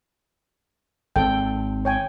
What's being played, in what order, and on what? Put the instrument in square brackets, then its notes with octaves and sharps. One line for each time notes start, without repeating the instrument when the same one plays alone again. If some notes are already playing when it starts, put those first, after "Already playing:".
[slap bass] G#1 C4 [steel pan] A4 G5
[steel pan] C#5 G5 G#5